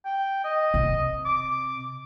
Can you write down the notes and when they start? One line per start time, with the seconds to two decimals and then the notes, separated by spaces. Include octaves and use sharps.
0.05 G5
0.45 D#5
0.74 C3
1.26 D6